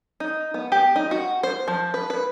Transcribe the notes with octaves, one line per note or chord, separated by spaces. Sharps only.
D#4
B3
G4
D#4
F#4
C5
F3
B4
B4